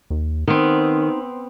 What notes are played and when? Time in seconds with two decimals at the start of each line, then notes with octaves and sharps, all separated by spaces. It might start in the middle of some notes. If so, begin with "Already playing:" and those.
0.10 D#2
0.47 D#3 B3 C4 D#4